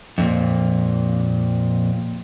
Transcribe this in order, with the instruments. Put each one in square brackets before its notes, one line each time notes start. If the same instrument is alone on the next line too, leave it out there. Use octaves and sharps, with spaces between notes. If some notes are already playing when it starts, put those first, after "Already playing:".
[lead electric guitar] F2 A#2